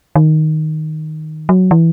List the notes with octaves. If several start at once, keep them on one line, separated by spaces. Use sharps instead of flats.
D#3
F#3
E3